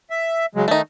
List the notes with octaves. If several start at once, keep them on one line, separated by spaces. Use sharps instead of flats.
E5
C#3 F#3 G#3
D#3 A3 D#4